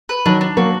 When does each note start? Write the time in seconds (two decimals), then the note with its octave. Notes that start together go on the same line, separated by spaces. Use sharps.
0.09 B4
0.26 D#3 F#3 D4
0.41 D4
0.57 F#3 A#3 F#4